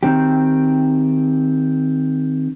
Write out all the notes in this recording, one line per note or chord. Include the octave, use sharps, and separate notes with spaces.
D#3 C4 G4